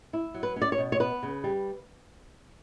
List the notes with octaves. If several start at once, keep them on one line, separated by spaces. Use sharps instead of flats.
E4
F#3
B4
C#4
D5
C#5
B2
C#5
B3 B4
C#3
G3